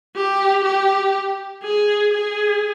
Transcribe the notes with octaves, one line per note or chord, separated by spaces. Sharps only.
G4
G4
G#4
G#4